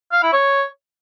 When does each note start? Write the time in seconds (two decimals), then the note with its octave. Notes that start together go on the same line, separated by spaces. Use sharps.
0.12 F5
0.23 E4
0.33 C#5